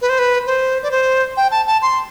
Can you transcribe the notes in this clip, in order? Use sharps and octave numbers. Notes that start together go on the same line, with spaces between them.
B4
C5
B4
C5
D5
C5
G5
A5
A5
C6